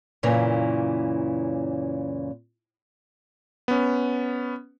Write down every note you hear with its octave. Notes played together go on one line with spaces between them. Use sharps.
F#2 A#2 C#3 E3
B3 C#4